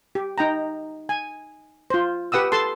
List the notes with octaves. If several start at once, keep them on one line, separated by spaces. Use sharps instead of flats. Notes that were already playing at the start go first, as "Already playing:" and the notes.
G4
D#4 G5 A#5
G#5
F4 C5
G4 B4 F#5 D#6 E6
A4 A5 C6